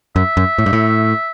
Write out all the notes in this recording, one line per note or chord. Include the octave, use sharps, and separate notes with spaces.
F#2 E5
F#2
A2
G2
A2